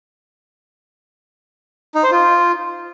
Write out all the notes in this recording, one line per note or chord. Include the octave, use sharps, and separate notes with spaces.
D#4
C5
F4